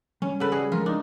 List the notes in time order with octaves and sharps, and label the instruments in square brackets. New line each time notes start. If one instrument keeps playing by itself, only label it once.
[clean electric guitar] G3 [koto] C#4
[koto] C#3 B4 [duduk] A4 [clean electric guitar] F#5
[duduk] G3 [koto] F#4 G#4
[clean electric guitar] F3 G#3 A4 [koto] F4 [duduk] A#4
[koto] D4 [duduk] D#4